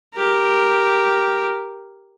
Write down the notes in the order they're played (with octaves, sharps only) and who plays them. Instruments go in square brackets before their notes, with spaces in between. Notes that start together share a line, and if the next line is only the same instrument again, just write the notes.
[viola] G4 A#4